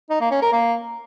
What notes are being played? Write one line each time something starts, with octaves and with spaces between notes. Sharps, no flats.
D#4
A#3
C#4
A#4
A#3